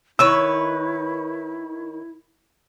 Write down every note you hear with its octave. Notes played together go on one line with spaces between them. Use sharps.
D#3 E4 B4 C#5 E6